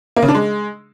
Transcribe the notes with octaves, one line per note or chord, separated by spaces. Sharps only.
A#3
C#3
D4
G#3